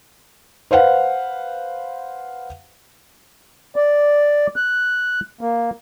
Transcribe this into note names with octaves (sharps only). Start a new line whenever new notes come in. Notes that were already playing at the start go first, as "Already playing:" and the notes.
B4 C5 F5 F#5
D5
F#6
A#3